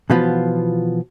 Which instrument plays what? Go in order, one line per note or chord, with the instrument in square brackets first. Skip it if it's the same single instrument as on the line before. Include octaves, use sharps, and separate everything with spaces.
[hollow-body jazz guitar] B2 E3 F3 B3 F4